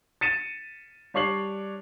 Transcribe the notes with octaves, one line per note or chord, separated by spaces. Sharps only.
A6 C#7 D#7 E7
G3 D4 C#5 C7 F#7